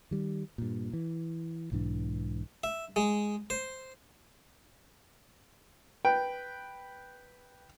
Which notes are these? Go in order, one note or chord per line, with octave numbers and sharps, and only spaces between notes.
D#3 G3
G2 A#2
E3
B1 G#2 E3 D4
E5
G#3
C5
B4 G5